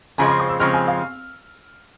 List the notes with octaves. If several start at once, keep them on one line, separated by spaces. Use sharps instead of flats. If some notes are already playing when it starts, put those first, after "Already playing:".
F2 C#3 F3 G#3 C4 G#5
C6
C#6
E6
F2 C#3 F3 G#3 C4 F6
G#5
F5